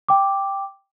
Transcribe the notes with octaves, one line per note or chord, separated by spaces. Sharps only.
G5 D6